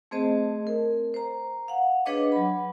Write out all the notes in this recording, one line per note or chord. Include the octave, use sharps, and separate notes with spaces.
A3 C4 G#4 C5 D#5 A5
A#4
C5 A#5
F5 F#5
D4 G#4 B4 C#5 D#5 D6
F#3 B5